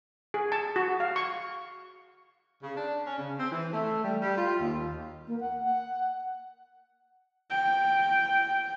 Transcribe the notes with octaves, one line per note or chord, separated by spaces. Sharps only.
G#4
A5
F#4
F5
C#6
C#3
D4
C#4
C#3
C4
E3
A3
G3
G3
F4
D#2
A#3
F#5
F#5
G5